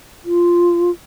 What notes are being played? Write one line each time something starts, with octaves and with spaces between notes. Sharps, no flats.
F4